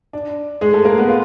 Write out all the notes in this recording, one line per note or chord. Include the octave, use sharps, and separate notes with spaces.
D4
G#3 G#4
A3 A4
A#3 A#4
B3 B4
F4